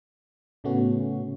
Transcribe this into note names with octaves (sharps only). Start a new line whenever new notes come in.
A2 C#3 A3 B3 C#4 F#4